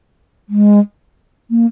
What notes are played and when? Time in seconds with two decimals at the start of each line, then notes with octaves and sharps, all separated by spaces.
0.49 G#3
1.50 A#3